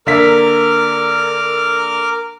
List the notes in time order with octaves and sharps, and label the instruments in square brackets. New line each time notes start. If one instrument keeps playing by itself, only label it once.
[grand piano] D3 A#3 B6 [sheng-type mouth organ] A#4 D6 F6